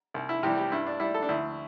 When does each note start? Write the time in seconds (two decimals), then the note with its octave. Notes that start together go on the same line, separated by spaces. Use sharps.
0.14 C2
0.29 E4
0.43 C3 E3 G3 G4
0.57 G4
0.72 G2 E4
0.86 D4
1.00 G3 E4
1.14 A4
1.22 D4
1.29 D2 E4